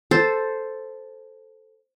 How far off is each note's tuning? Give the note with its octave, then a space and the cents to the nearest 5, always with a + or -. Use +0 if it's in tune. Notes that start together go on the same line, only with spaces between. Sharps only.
A4 +0 C5 +0